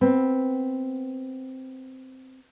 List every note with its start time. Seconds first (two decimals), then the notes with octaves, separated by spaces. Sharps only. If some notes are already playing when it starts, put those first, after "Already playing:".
0.01 B3 C4